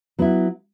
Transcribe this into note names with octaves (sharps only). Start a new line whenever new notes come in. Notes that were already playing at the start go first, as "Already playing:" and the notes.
F#3 B3 E4